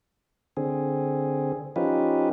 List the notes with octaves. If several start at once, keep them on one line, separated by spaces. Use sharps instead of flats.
D3 C4 G#4
F3 C#4 D#4 F4 G4 B4